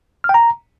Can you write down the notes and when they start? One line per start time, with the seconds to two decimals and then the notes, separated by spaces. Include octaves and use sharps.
0.24 F6
0.29 G5
0.34 A#5